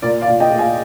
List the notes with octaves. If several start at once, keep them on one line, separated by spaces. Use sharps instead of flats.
A#2 A#4 D5
D5 F5
A#2
D#5 G5
A#2
F5 G#5